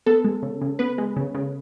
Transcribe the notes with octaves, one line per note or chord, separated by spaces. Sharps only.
B3 A4
G#3
C#3
C#3
B3 B4
G#3
C#3
C#3